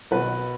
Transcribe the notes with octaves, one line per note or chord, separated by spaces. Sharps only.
B1 B2 F#3 B4